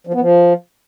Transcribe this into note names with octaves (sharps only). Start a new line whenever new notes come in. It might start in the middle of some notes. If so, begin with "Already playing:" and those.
F3
B3
F3